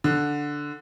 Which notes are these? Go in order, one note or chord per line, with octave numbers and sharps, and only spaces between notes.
D3